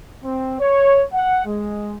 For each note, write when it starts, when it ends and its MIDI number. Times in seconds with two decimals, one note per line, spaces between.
0.23 0.56 60
0.60 1.03 73
1.13 1.42 78
1.45 1.96 56